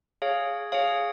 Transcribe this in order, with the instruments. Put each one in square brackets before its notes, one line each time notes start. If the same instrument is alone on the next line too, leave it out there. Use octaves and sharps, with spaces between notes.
[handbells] G#4 C#5 F5
G#4 C#5 F5